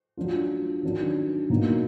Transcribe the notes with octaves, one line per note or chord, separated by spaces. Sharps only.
F#3 D4 F4
D#3 F#3 D4
B2 F#3 A#3 D#4